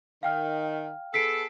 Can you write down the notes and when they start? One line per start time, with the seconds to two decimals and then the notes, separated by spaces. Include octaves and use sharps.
0.23 D#3 F5 G5 F6
1.14 B3 G#4 A4 B6 C7 D7